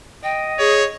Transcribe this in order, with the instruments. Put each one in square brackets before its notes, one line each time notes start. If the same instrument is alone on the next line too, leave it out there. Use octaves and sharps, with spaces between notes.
[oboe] D#5 [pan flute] G5
[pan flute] G#4 [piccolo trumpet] C#5